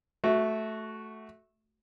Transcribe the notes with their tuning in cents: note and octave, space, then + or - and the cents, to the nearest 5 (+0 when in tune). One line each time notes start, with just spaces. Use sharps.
A3 -10 F#4 +0